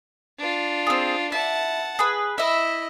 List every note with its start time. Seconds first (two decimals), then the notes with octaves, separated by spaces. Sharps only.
0.38 D4 F4
0.87 C4 G#4
1.32 E4 F#5 A5
1.99 G#4 B4
2.38 E4 D#5 E5 B5